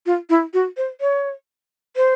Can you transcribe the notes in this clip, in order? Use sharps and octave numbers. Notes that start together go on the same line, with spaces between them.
F4
E4
F#4
C5
C#5
C5